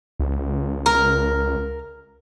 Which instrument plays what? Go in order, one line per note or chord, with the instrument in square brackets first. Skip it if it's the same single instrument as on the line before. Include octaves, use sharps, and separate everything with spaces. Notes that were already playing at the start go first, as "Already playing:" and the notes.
[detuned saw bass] C#2
[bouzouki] A#4